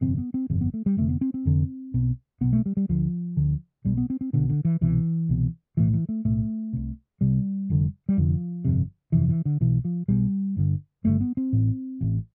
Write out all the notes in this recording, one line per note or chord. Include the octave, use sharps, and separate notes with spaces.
G1 F2 C3 C4
B3
C4
G1 F2 C3
B3
A3
G3
F1 F2 D3 A3
B3
C4
C4
F1 F2 D3
B1 B2
B1 B2 B3
A3
G3
G3
D2 D3 F3
D2 D3
B1 B2 G3
B3
C4
C4
B1 B2 D3
D3
E3
C2 B2 E3
C2 B2
B1 A2 E3
E3
A3
B1 A2 A3
C2 C3
C2 C3 G3
F1 F2 D3
G3
F1 F2 D3 F3
G1 F2 C3
G1 F2 C3 E3
E3
D3
B1 B2 E3
F3
B1 B2 G3
G1 G2 D3
G1 G2 D3 A3
B3
C4
A1 A2
A1 A2